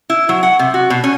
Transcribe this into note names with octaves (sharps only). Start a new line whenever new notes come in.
E4
F#3
F#5
C3
F#4
B2
C#4